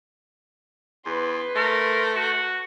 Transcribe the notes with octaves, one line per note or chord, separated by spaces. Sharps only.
E2 B4 C6
A3 A#4
F#4